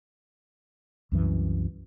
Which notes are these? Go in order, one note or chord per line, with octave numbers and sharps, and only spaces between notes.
C2 F#2 E3